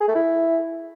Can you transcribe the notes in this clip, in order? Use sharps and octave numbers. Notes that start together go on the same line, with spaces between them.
G#4
A3
E4